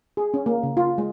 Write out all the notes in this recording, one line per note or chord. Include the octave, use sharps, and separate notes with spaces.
G#4
C#4
A#3
C#3
F4
G#3